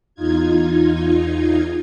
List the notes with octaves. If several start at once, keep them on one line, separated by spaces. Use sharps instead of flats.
E2 D#4 F4 G#6